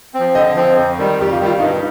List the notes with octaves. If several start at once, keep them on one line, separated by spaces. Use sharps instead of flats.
C4
F3
D3 D#5
F3 C4
F2
D#3 G3
F2 G4
F4
D#3 G3
F4
G2 D#4